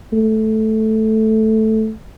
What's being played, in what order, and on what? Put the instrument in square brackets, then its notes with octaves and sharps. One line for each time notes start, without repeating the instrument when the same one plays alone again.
[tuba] A3